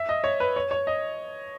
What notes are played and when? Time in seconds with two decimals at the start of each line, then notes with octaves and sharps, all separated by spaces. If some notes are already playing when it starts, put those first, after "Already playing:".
Already playing: E5
0.09 D#5
0.24 C#5
0.40 B4
0.56 C#5
0.71 C#5
0.87 D#5